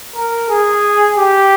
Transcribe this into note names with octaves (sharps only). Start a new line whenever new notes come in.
A#4
G#4
G4